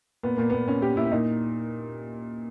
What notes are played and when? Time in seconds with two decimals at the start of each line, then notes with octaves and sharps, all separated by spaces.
0.23 A#2 B3
0.37 A#2 A#3
0.50 A#2 B3
0.67 A#2 C#4
0.82 A#2 G4
0.96 A#2 E4
1.11 A#2 D#4